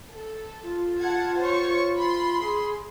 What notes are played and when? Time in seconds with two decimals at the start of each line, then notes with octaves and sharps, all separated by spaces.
0.10 A4
0.63 F4
0.98 F#5 A5 G#6
1.37 C5 C#5 C#6
1.96 B5 C6
2.40 G#4